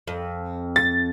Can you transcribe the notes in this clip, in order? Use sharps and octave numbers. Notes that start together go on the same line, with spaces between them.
F2
A6